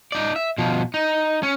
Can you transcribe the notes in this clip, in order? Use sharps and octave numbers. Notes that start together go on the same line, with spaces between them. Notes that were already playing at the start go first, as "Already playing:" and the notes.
D#4 D5
E5
B2 F3
D#4
C#4